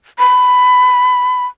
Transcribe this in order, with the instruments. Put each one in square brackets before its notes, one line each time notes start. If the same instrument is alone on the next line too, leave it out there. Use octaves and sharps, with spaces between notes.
[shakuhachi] B5